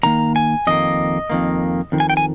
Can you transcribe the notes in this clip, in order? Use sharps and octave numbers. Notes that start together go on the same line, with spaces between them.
F2 D#3 A#3 A#5
G#5
F2 D#3 A#3 D#5
F2 D#3 A#3
F2 D#3
G#5
G5
G#5